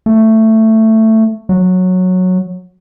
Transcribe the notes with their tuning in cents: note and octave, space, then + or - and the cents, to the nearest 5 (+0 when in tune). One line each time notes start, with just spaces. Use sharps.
A3 +10
F#3 -10